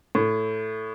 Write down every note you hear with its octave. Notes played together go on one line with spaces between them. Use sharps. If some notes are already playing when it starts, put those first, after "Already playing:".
A2